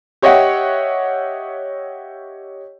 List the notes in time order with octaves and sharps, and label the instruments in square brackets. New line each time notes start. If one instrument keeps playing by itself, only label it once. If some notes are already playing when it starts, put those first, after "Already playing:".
[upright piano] G4 C#5 D#5 E5 F#5 G5